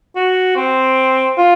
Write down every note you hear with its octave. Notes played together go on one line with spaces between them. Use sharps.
F#4
C4
F4